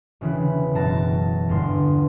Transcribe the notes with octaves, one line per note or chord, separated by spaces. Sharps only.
E1 C#3 E3 B5
F#1 B2 A#4 A5 A#5 A#6
G1 E2 D3 C6